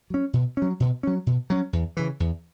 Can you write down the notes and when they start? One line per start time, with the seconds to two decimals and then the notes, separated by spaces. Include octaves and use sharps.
0.10 F#3 C#4
0.33 B2
0.57 F#3 C#4
0.80 B2
1.03 F#3 C#4
1.27 B2
1.50 F#3 C#4
1.73 E2
1.97 C#3 E3
2.20 E2